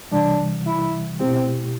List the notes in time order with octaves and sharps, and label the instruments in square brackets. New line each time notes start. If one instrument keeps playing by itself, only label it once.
[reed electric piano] C2 C3 E3 G3 [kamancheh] D4
[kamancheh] E4
[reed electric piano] B2 A3 E4 G4 [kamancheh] C4